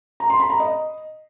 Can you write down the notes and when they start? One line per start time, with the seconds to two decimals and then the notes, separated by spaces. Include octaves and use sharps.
0.20 A#5
0.30 C6
0.40 B5
0.50 A#5
0.60 D#5